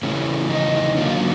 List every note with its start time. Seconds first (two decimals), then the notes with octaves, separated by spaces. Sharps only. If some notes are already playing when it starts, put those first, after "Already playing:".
0.03 C#3 E3 A3 C#4
0.50 D#4
0.97 D3 F#3 A#3 C#4 F4